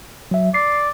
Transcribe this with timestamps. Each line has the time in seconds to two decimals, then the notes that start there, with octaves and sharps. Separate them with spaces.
0.31 F#3 E5
0.54 D5 C7